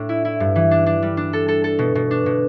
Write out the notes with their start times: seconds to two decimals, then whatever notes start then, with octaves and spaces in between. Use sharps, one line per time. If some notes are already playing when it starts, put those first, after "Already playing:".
Already playing: A2 D4
0.09 E4
0.25 E4
0.40 G2
0.56 E3
0.71 D4
0.86 D4
1.02 G3
1.17 D4
1.33 A4
1.48 A4
1.64 A4
1.79 B2
1.95 B2
2.11 D4
2.26 B2